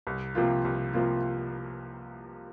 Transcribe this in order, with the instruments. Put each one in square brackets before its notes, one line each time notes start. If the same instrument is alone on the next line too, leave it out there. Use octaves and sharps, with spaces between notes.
[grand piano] C2
C3 F3 A#3 F4
C2
C3 F3 A#3 F4